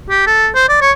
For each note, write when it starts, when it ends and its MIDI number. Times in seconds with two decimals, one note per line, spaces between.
0.10 0.23 67
0.26 0.48 69
0.55 0.64 72
0.69 0.78 74
0.81 0.91 73